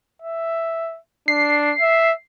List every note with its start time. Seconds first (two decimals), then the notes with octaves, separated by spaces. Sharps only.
0.22 E5
1.28 D4 C7
1.81 E5